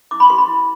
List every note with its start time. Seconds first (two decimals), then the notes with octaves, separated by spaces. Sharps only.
0.11 E4 D6
0.20 B5
0.29 G4 B4 C6
0.38 B5
0.48 E4